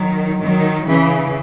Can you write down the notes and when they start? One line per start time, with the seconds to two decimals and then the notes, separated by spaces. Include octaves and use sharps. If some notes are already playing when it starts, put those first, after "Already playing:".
Already playing: D#3 F#3
0.42 D#3 F#3
0.88 C#3 E3